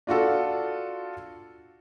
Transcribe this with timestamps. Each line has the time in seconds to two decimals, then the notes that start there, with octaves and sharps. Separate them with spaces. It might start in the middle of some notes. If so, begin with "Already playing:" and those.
0.07 D4 F4 F#4 A4